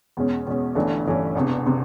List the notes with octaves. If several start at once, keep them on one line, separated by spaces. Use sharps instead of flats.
E2 B2 G#3 C#4
E2 B2 G#3 C#4
G1 G2 E3 A3 C#4
G1 G2 E3 A3 C#4
E1 E2 C3
C3